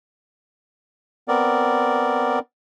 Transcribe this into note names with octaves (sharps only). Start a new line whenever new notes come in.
B3 C4 A#4 D5